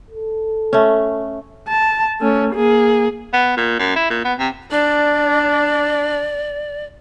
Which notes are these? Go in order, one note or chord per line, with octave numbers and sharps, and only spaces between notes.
A4
A3 C#4
A5
A3 C#4
A#3 G#4
B3
A#2
F#2
E4
A#2
B3
C3
D4 D5